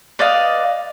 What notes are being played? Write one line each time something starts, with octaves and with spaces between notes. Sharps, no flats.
B4 D5 D#5 F5